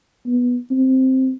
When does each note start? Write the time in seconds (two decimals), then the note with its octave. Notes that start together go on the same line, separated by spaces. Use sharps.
0.27 B3
0.71 C4